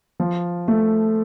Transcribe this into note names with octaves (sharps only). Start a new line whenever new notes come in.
F3
A3